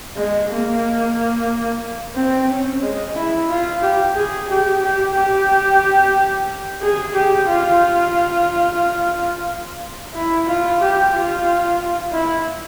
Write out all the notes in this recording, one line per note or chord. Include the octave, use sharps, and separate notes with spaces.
G#3
A#3
C4
C#4
G#3
E4
F4
G4
G#4
G4
G4
G4
G#4
G4
F4
E4
F4
G4
F4
E4